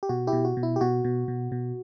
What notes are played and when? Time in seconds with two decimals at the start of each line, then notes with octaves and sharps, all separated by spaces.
0.03 G4
0.09 B2 F#4
0.27 E4 G4
0.33 B2
0.45 F#4
0.57 B2
0.63 E4
0.76 G4
0.81 B2 F#4
1.05 B2
1.28 B2
1.52 B2